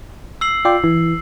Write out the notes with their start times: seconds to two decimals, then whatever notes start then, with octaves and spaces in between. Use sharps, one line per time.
0.41 E6 C7 F#7
0.65 F4 D5 G5
0.84 E3